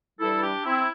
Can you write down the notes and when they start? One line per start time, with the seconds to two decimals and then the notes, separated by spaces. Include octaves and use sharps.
0.19 G2 E3 G3 E4 A4
0.42 D4 G4
0.65 C4 E4